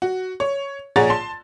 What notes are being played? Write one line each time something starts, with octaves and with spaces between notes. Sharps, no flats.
F#4
C#5
A#1 G#4 C#5 F#5 A#5 A6
A5 C6